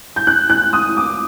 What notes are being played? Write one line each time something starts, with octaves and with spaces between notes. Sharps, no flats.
G6
F#6
F#6
D#6
D6